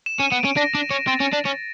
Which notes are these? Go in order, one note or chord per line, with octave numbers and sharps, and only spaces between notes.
E7
C#4
D#7
B3
C#4 D7
D4 A#6
D4
C#4
C4 A6
C#4
D4
C#4